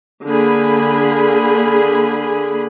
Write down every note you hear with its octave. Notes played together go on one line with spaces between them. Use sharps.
D3 A#3 G#4 B5